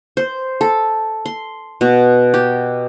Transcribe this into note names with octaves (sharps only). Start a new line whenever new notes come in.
C5
A4
C6
B2
G4